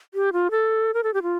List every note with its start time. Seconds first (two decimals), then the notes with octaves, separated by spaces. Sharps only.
0.14 G4
0.33 F4
0.51 A4
0.94 A#4
1.03 A4
1.14 G4
1.23 F4